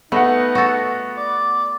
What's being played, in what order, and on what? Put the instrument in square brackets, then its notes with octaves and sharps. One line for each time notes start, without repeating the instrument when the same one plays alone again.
[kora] A3 [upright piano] B3 F#5 [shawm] D#4
[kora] F#4 A4
[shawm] D5